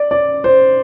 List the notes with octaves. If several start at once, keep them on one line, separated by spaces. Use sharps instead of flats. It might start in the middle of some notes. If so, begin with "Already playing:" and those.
Already playing: D5
D5
C5